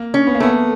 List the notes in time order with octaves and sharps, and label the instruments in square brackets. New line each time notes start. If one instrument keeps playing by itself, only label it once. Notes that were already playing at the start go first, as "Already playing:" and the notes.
Already playing: [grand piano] A#3
[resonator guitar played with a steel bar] C#4
[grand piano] B3
A#3
[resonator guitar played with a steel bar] A3 [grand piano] B3